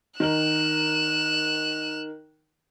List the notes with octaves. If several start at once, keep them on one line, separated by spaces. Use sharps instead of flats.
D#3 A#4 F#6 E7 F#7